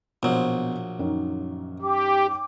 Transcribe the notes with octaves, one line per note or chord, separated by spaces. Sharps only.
A#1 B2 F#3 C5
F#2 D#3
G4 G5 D6